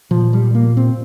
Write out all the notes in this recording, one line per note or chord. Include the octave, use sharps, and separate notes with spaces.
A#2 F3
G3
A#3
C4